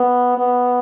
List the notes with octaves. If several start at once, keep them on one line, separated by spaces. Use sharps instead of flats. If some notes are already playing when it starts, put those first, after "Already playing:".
Already playing: B3
B3